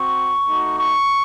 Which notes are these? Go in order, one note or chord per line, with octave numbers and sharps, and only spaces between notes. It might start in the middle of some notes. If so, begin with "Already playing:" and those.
Already playing: C4 F#4 C#6
A3 D#4 F#4
C#6